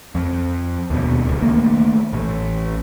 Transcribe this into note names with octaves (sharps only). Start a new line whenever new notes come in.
F2
D#2 B2
D1 C#2
D#3 A3 A#3
A1